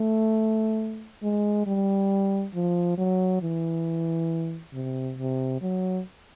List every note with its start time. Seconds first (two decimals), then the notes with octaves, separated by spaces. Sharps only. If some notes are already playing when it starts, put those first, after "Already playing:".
Already playing: A3
1.22 G#3
1.67 G3
2.55 F3
2.98 F#3
3.42 E3
4.73 C3
5.18 C3
5.62 F#3